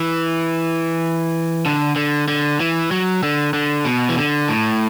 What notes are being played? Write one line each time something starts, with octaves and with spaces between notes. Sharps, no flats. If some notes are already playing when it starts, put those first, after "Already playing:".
Already playing: E3
D3
D3
D3
E3
F#3
D3
D3
B2
E3
D3
A2